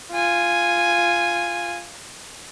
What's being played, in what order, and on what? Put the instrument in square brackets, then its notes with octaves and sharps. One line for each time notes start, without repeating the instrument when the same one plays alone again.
[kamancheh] F4 G#5